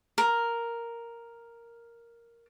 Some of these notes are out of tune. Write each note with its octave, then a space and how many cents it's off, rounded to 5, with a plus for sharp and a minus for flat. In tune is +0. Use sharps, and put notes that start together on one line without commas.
A#4 +0